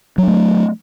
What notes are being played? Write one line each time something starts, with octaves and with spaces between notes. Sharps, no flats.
F#3 A3 D4